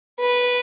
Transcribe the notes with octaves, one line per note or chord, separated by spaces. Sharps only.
B4